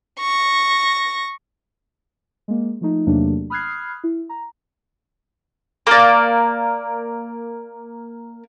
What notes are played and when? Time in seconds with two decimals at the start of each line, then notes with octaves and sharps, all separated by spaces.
0.20 C#6 A#6
2.48 G#3 A#3
2.81 F3 A3 D#4
3.06 E2 C3 F#3 A3 A#3 D4
3.50 B5 D#6 F6 F#6 G#6 C7
4.04 E4
4.29 A#5
5.87 A#3 A#4 D5